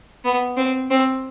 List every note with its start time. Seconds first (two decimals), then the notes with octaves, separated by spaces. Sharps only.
0.25 B3
0.57 C4
0.91 C4